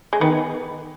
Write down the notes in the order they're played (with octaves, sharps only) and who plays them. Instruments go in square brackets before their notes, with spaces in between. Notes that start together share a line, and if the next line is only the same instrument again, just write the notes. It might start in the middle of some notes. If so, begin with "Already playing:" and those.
[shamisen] G#3
[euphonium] D#3 [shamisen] B3